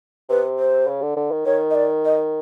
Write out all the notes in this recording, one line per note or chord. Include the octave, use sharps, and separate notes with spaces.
C3 B4
C5
C#3
D3
D3
D#3
D#3 C#5
D#5
D5
D#5